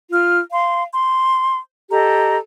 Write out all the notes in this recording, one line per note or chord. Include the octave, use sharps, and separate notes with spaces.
F4 F6
F5 C6
C6
G4 A4 D#5 A#5